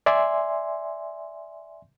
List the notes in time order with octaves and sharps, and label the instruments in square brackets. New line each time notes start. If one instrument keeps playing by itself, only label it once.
[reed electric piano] D5 E5 G#5 C6